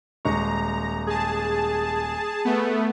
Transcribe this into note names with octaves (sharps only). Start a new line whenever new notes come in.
D#1 G#3 A#5 C#6
G#4 A5
A3 B3